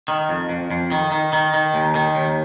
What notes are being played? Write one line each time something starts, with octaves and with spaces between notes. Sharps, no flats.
D#3
F2
F2
F2
D#3
D#3
D#3
D#3
D#2
D#3
D#2